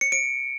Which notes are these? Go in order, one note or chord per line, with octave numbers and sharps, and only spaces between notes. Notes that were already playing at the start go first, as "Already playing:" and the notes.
C#7
D7